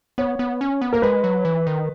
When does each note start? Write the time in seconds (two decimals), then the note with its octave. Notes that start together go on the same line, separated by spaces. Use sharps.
0.18 B3 C#5
0.39 B3
0.61 C#4
0.81 B3
0.93 A#3 A#4
1.02 G#3 B4
1.24 F#3
1.45 E3
1.67 D#3